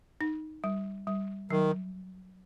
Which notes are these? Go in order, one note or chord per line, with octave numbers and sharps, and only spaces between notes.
D#4
G3
G3
D#3 F#3